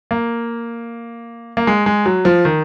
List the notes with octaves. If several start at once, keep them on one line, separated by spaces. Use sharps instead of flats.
A#3
A#3
G#3
G#3
F#3
F3
D#3